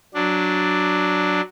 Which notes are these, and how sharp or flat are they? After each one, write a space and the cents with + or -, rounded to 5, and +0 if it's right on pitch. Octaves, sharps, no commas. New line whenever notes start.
F#3 +0 D4 +0